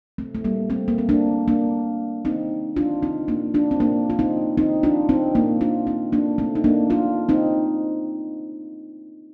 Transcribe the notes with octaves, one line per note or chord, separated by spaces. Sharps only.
A3 C4
A3
G3 A#3
A3 C4
A#3
C4
A#3 D4
A#3 D4
C4 D#4
D4 F4
C4 D#4
A#3 D4
D4 F4
C4
A#3 D4
F4
C4 D#4
C4 D#4
D4 F4
C4 D#4
A#3 D4
D4 F4
C4 D#4
A#3 D4
A3 C4
D#4
A#3 D4
D4 F4
C4 D#4